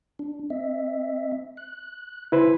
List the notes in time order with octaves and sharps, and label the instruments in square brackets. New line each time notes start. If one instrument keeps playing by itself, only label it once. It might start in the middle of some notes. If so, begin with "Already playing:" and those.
[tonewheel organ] D4
C4 D#5 E5
F#6
[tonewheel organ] C#3 [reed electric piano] E4 B4 C5